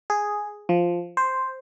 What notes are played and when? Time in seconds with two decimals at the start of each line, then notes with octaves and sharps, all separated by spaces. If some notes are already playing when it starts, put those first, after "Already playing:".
0.10 G#4
0.69 F3
1.17 C5